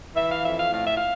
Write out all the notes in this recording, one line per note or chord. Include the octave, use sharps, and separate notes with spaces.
E3 E5
F5
F2 E5
F5
A2 F5
E5
F5